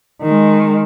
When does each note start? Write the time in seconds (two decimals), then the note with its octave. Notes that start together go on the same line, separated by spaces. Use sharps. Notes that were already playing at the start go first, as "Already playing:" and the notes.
0.23 D#3 G#3